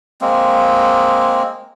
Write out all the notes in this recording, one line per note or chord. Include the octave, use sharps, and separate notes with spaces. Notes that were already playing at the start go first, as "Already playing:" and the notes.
G#3 A#3 C4